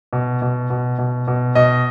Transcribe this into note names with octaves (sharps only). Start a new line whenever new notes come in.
B2
B2
B2
B2
B2
B2 D#5